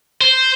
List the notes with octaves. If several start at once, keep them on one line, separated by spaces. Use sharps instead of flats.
C5